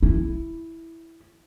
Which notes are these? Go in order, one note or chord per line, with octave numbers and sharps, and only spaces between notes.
E4